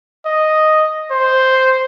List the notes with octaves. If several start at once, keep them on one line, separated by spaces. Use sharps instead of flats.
D#5
C5